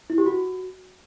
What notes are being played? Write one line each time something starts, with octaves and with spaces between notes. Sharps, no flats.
E4
G4
F#4